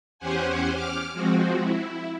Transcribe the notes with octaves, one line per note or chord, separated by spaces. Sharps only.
E2 C#4 G4 C5 F#5 G#5
D6 F6
F3 G#3 C4 F#4
E4